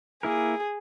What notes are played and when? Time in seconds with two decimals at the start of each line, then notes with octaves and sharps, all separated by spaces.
0.23 A#3 E4 G#4 A#4